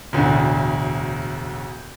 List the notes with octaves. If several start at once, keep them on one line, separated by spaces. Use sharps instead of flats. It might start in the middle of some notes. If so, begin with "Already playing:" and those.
E1 D2 A2 D3